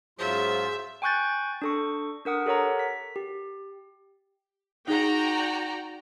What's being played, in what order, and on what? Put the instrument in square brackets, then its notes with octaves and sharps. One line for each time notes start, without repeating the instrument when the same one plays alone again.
[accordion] G#2 C#3 F4 [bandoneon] F#3 C5 [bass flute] G#4 [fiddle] E5
[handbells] G5 G#5 C#6 F#6 G6 A6
D4 A4 C#6
D4 A#4 F#5 D#6
G4 A4 A#4 C#5 F#5 A#5
B6
G4
[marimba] D#4 G#4 [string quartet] F#4 D5 [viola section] G5 A#5